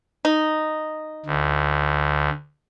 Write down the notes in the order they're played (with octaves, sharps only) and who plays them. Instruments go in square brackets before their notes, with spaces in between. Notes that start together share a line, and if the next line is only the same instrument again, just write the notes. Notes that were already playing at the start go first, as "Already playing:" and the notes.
[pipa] D#4
[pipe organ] D2